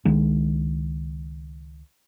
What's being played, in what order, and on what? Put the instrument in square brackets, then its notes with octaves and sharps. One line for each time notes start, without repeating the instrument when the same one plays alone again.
[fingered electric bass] C#2 D#3 G#3